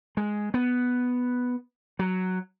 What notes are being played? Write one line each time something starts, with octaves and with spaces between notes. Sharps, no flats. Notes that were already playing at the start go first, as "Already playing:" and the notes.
G#3
B3
F#3